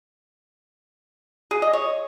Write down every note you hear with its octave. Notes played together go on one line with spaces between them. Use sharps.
G#4
D#5
C#5